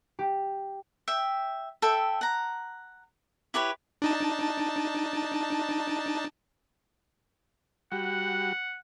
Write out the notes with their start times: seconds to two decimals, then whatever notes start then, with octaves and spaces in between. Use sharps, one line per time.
0.19 G4
1.08 E5 G5
1.82 A4 E5 G5
2.21 F#5 A#5
3.54 E4 G4 B4 C#5
4.02 D4 D#4 A5
7.92 G3 F#4 F#5